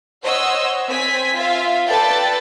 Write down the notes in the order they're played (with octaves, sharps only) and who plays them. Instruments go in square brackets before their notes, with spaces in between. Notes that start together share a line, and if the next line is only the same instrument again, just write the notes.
[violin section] C5 C#5 D#5 F#5 E6
C4 G#5 B6
F4 E5 F5
A4 B4 D5 G5 A5 A6